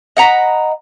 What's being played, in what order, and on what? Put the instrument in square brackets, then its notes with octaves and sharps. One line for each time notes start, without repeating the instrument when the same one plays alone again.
[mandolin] D#5 F#5 A#5 B5